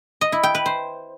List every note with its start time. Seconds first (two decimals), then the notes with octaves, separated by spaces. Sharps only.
0.21 D#5
0.32 E4
0.43 G5
0.55 B4
0.66 C5